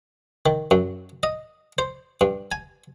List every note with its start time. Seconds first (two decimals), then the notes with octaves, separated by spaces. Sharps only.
0.46 D#3
0.71 F#2
1.23 D#5
1.78 C5
2.21 G2
2.52 G#5